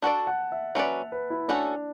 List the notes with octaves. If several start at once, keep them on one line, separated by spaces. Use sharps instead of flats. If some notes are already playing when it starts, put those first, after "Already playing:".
D4 F#4 A4 D5 A5
F#5
E5
F#3 C#4 E4 B4 D5 E5
B4
E4
A3 C#4 D4 F#4 A4